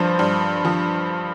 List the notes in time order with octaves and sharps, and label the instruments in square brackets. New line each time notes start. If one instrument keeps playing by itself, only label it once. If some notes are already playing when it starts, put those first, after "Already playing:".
Already playing: [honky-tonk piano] G2 F3 C5
G2
F3